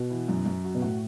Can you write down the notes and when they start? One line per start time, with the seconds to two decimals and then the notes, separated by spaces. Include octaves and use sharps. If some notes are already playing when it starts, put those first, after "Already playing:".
Already playing: B2 F#4
0.10 E3
0.28 F#2
0.46 F#2
0.64 F#4
0.75 B2
0.82 A2 F#4